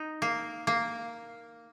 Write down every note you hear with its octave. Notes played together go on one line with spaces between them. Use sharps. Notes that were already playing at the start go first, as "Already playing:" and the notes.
Already playing: D#4
A#3
A#3